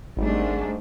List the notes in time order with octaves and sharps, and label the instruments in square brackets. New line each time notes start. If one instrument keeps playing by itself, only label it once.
[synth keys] G#1 [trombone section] G#2 [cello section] G3 A3 D4